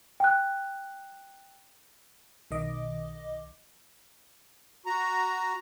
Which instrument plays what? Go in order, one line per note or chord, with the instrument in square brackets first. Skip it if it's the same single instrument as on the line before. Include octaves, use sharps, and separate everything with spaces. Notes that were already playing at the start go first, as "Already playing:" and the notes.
[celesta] G5 F#6
[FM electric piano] B1 D#3 D#5 D6
[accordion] F#4 A#5